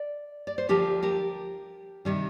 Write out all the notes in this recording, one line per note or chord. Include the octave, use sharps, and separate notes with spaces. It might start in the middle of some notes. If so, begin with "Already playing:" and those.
Already playing: D5
D5
C5
D2 D3 F3 G4 A#4
G4 A#4
C3 D#3 G3